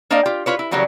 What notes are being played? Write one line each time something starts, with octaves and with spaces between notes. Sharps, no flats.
A#3 D4 C5 D5 D#5 F5
F4 G4
E4 F4 B4 C#5
E4
C#3 E3 F#3 G3 A#3 C#4